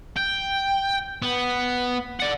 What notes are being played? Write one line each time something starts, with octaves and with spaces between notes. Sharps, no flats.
G5
B3
D5 F#5